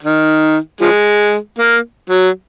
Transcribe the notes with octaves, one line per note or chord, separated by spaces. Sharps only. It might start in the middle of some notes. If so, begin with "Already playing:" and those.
D#3
F3 G#3
A#3
F#3